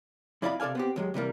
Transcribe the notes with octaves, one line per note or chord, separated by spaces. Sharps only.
F2 E4 D5 D#5 F5 B5
C3 A4 D5 F5 G#5
B3 C4 G4
D#2 F#3 G#3
C3 E3 G3 A#3